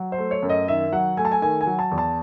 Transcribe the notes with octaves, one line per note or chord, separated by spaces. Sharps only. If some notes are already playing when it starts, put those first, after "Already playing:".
Already playing: F#3
C5
A3
C#5
F#2
D#5
D#3 E5
F#3 F#5
A3 G#5
A5
G#5
D#3 G#5
G#5
F#3
A5
E2
A5